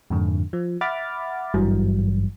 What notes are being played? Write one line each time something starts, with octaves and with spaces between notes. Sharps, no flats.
F2 G#2 D3
F3
E5 F#5 B5 D6 F6 A6
G#1 G2 E3 F#3 G3